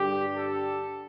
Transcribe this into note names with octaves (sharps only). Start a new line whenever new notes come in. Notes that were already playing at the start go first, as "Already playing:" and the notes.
Already playing: G2 D3 G3 G4
A4